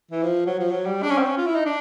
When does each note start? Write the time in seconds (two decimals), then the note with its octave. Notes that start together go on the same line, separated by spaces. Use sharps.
0.11 E3
0.23 F3
0.46 F#3
0.59 F3
0.70 F#3
0.86 G3
1.02 D4
1.10 C#4
1.18 C4
1.26 C#4
1.37 F4
1.46 E4
1.55 D#4
1.65 D4